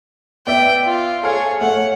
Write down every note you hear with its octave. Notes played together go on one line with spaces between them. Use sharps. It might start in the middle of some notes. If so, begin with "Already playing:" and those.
B3 D5 E5 G5
F4
G#4 A4 C#5 F5
A3 C#5 F#5